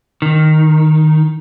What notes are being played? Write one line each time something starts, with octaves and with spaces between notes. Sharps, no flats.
D#3